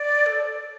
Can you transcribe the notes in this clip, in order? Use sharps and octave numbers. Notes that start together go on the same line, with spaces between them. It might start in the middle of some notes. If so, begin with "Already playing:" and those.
Already playing: D5
A4